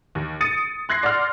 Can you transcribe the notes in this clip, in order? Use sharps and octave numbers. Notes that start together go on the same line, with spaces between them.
D#2
D#6 A6 C#7 D#7
C6 F#6 G#6 A#6 C7
D5 F#5 C6 F6